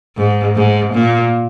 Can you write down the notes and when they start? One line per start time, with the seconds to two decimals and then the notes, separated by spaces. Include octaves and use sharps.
0.17 G#2
0.55 G#2
0.93 A#2